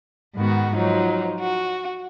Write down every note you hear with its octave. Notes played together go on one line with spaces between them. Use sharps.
G#2 D#3 B3 F#4
F3 F#3 D#4
F#4